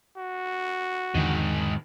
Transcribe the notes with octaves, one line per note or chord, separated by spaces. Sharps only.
F#4
E2 G#2 D3 D#3